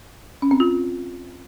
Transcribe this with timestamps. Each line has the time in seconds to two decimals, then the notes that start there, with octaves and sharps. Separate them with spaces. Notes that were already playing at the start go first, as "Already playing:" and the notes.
0.42 C#4
0.51 C4
0.60 F4